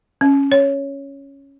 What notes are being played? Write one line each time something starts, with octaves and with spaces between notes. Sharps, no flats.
C#4
C#5